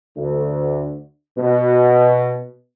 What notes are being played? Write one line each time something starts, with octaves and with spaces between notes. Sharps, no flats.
D2
B2